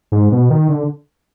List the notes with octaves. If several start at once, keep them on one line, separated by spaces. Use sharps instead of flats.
G#2
B2
D#3
D3